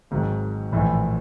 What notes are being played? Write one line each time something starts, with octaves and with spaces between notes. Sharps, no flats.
G#1 G#2 D#3 F#3
A#1 A2 E3